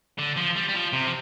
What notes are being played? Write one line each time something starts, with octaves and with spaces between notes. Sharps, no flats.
D3
F3
G3
G3
F3
C3
F3